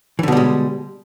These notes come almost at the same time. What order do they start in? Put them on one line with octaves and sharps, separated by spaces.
E3 D3 B2 G3 G#3